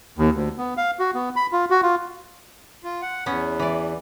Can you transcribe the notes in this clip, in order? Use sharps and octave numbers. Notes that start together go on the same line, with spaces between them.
D#2
D2
B3
F5
F#4
B3
B5
F4
F#4
F4
F4
F#5
E2 B3 C#4
E3 D5